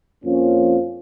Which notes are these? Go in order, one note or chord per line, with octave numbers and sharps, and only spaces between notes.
F2 F3 A#3 C#4 F4